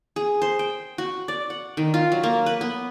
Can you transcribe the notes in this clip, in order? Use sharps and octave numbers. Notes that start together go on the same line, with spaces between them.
G#4
C5
G5
F#4
D5
F#5
D#3
F4
F#3
A#3
B4
B3